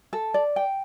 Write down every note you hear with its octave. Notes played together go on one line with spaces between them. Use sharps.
A4
D5
G5